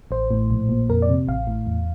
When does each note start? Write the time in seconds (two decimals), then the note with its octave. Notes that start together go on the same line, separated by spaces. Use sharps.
0.11 A1 C5
0.31 A2
0.51 A#1
0.69 A#2
0.89 F2 A#4
1.02 D5
1.09 C3
1.28 A1 F5
1.47 A2
1.67 E2